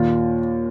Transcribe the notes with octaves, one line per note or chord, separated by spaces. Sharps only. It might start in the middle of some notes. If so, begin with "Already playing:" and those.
Already playing: D#2 A#2 F4